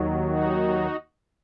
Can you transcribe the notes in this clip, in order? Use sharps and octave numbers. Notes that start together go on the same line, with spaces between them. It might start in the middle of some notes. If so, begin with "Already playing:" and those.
Already playing: D#2 D#3 F#3
D#4 F#4